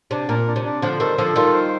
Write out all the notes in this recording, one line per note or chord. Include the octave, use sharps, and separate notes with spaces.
C3 D4
A#2 A#4
D4
C3
D4
D3 F3 C5
D#3 G3 A4
D3 F3 A4
D#3 G3 F4
C5